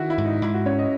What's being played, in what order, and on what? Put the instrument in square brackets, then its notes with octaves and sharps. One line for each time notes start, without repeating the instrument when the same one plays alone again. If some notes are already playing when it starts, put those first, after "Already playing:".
Already playing: [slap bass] D#3 [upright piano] E4 F#4
[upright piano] E4
[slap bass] G#2
[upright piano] D#4
[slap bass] G#2 [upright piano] E4
[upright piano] F#4
[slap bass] C#4 [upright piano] C#5
[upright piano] D#5